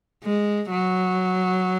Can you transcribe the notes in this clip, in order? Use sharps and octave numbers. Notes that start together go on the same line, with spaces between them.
G#3
F#3